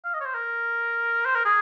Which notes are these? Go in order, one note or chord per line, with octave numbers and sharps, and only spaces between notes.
F5
D#5
C#5
C5
A#4
C5
A#4
G#4